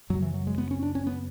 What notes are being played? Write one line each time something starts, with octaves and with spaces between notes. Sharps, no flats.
F#2 C#3 F#3
E3
F#3
G#3
B3
C#4
D4
C#4
B3